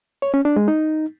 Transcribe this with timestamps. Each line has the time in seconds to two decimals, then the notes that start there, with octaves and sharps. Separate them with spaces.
0.22 C#5
0.34 C#4
0.45 D4
0.56 G#3
0.68 D#4